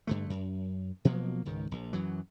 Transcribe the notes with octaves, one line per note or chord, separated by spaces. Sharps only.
G2 D3 A3
F#2
B2 F3 F#3 A#3
C#2 G#2 D#3
A#1
F#2 E3 F#3